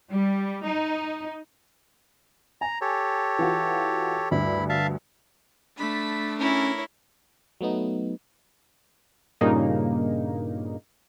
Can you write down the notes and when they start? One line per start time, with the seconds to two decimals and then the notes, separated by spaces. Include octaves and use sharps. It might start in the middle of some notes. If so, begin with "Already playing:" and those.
0.10 G3
0.65 D#4
2.61 G#5 A#5
2.81 G4 A4 C#5
3.39 E3 F4 F#4
4.31 D2 G2 E4 B5
4.69 E5 F5 A5
5.77 A3 D4 B5 B6
6.39 C#4 E4 A#4 C#5 B5
7.61 F#3 A3 B3 D#4
9.41 G2 A#2 C#3 A#3 D#4